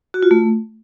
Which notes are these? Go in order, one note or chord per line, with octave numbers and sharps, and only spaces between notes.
F#4
F4
A3